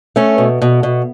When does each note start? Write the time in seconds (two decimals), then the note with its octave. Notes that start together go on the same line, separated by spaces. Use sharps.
0.16 A3 C#4
0.38 B2
0.62 B2
0.83 B2